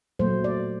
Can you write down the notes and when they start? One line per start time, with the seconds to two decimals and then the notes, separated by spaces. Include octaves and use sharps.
0.19 A#2 F#3 A3 C5
0.44 D5